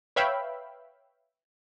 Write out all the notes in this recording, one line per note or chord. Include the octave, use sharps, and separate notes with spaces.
B4 C#5 E5 F5 G5 B5